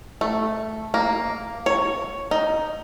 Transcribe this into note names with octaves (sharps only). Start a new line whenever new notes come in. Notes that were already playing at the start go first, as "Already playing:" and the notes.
A3
A#3
C#5
D#4